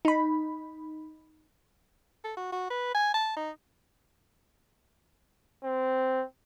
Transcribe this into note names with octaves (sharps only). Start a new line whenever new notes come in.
D#4 B5
A4
F#4
F#4
B4
G#5
A5
D#4
C4